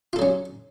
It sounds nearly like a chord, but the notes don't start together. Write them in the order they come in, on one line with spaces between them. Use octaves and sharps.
F4 A4 F#3 C#4